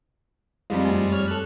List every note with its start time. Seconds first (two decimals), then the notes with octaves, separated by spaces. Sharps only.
0.70 F2 F3 G3 G#3 C4
0.85 F#2 A3
1.12 G3 C#5 F6
1.28 A4 F#6